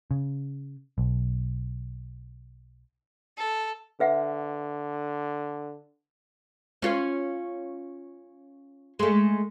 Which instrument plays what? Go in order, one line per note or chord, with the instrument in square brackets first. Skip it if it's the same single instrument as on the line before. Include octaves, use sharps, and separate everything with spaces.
[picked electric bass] C#3
B1
[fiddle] A4
[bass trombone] D3 [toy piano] B4 E5 F#5
[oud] C#4 F4 C#5
G#3 A3